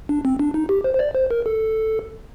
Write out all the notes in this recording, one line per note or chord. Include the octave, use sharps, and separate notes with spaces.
D4
C4
D4
D#4
G4
C5
C5
D5
C5
A#4
A4